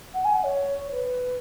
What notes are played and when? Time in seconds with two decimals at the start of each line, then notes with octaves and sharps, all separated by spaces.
0.14 F#5
0.24 G#5
0.34 F#5
0.44 C#5
0.92 B4